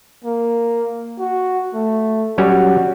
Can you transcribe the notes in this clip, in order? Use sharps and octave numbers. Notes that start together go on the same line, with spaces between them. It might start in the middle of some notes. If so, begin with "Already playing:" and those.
A#3
F#4
A3
F#3 G3 C#4 F#4